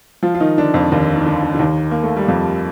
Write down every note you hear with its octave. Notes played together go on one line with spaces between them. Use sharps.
F3 F4
F4
D#3 D#4
D3 D4
F2 F3
D#2 D#3
D#3
D3
D3
D3
D#2 D#3
A#3
A3
G3
F2 F3